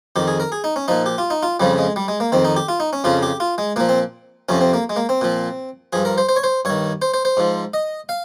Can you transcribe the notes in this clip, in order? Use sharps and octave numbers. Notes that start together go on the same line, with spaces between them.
F2 D#3 G4
G#4
A#4
G#4
D#4
C#4
A#2 F3 D#4
G4
F4
D#4
F4
F2 C#3 F3 G3
G#3
G3
G#3
A#3
F2 D#3 C4
D#4
G4
F4
D#4
C#4
F2 C#3 F3 F4
G4
F4
G#3
A#2 F3 A#3
C4
F2 C3 F3 C#4
C4
A#3
G#3
A#3
C4
A#2 F3
G2 F3 G#4
A#4
C5
C5
C#5
C5
G2 D#3 C#5
C5
C5
C5
G#2 F3
D#5
F5